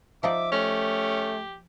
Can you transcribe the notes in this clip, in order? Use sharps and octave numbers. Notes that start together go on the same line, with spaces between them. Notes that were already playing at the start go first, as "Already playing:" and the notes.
F3 D#4 D5 E5 D6
A3 C#4 G4